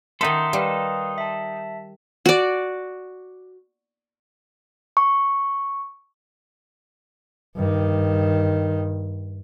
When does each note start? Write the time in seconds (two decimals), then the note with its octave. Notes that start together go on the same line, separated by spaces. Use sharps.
0.21 D#3 D#4 A4 A#4 E5 F#5 B5 C6
0.53 G3 B4 F5
1.18 E5 A5
2.26 F#4 D5
4.97 C#6
7.56 G2 D#3